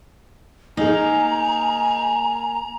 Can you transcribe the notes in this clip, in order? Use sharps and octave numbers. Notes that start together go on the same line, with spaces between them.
A#3 D#4 G#4 G#5 A#5